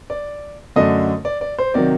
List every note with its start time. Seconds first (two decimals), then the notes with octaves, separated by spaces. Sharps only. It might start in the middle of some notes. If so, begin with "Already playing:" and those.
0.10 D5
0.76 F#2 D3 A3 D4 D#5
1.25 D5
1.41 D5
1.58 C5
1.74 C3 D#3 F#3 D5